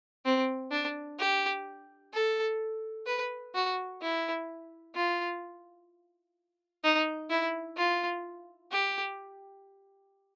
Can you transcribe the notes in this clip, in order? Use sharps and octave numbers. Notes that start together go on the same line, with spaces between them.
C4
D4
G4
A4
B4
F#4
E4
F4
D#4
E4
F4
G4